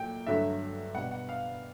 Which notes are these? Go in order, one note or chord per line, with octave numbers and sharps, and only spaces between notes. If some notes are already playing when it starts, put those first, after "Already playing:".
Already playing: A#2 F#3 A3 G5
G2 D3 F#3 A3 E5
B2 G3 F#5
F#5
F5